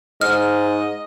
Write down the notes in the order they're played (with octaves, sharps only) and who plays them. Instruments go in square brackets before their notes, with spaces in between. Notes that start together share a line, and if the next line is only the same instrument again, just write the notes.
[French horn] G#2 [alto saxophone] D#5 [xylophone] F6